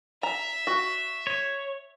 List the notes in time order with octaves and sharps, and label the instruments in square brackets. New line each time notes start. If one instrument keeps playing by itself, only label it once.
[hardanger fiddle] E5 [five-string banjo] A#5
[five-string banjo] F#4
[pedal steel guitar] C#5